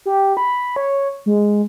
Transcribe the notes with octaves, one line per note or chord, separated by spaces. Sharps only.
G4
B5
C#5
G#3